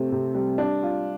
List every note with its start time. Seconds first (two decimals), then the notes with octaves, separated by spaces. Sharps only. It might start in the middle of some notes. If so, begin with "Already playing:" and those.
Already playing: C3 A3 C4
0.12 C3
0.35 G3
0.58 D4
0.83 F4